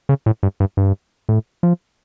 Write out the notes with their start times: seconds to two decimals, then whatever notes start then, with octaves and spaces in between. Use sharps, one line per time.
0.09 C#3
0.26 A2
0.43 G2
0.60 G2
0.77 G2
1.29 A2
1.63 F3